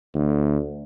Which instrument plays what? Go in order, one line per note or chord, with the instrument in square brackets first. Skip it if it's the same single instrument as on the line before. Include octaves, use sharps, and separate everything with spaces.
[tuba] D2